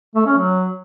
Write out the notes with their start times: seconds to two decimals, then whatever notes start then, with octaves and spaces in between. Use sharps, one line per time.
0.15 A3
0.26 C#4
0.38 F#3